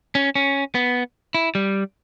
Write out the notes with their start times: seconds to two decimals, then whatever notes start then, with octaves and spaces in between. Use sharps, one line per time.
0.15 C#4
0.35 C#4
0.75 B3
1.35 E4
1.55 G3